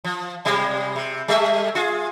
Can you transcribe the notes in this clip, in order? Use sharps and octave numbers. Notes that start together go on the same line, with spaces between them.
F3
C3 G3 G#3
C3
G3 A3 E5
F4 G#4